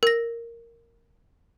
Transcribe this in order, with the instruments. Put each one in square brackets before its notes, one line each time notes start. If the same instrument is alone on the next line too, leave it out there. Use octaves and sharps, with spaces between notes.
[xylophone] A#4 A#6